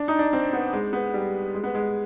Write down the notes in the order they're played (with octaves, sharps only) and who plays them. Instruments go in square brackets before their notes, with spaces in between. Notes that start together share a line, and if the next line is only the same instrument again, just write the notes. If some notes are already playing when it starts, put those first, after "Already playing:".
Already playing: [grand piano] D4
D#4
D4
C4
B3
G#3
B3
G3
G#3
B3
G#3